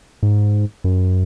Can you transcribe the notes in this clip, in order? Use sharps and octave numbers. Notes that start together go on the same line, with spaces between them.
G#2
F#2